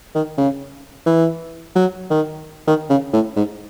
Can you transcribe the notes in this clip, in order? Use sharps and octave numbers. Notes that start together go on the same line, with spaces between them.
D#3
C#3
E3
F#3
D#3
D#3
C#3
A2
G#2